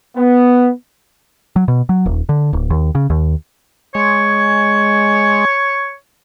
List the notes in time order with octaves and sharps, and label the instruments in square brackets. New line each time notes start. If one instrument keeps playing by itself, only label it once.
[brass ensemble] B3
[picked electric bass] F#3
B2
F#3
D#1
D3
D1
D#2
C#3
D#2
[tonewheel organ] G#3 [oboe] C#5